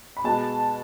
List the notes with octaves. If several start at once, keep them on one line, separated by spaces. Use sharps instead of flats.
B5
B2 G#3 B3 A5